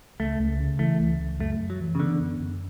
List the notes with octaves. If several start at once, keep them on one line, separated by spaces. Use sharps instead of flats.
C#2 A3
C#2
C#3
E3 A3
C#2
C#2
F#2 A3
F#2
F#3
E3
C#3
D3 B3
F#2
F#2